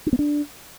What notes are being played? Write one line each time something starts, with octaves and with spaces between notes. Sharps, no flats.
D4
B3
D4